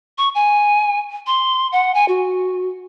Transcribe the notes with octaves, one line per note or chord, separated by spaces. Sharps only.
C#6
G#5
C6
F#5
G#5
F#4